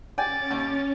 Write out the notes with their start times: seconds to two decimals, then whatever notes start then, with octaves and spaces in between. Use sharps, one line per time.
0.18 C#4 D5 G5 G#5 D6 A6
0.50 D#2